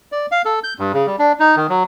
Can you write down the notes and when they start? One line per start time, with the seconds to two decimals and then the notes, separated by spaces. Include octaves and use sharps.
0.12 D5
0.32 F5
0.45 A4
0.64 G6
0.79 G2
0.94 C#3
1.07 G3
1.19 D4
1.40 D#4
1.56 D#3
1.69 F#3